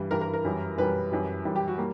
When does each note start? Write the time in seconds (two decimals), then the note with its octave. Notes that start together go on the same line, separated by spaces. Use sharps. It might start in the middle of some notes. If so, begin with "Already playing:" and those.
Already playing: G2 E3 G3
0.10 G2 E3 G3 A#4
0.21 A#4
0.34 A#4
0.45 F#2 E3 G3
0.77 F#2 E3 G3 B4
1.12 F#2 E3 G3
1.45 F#2 E3 G3
1.56 G4
1.68 F#4
1.78 G3 A#3